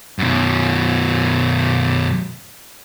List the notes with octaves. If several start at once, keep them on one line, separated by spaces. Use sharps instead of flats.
F#2 B2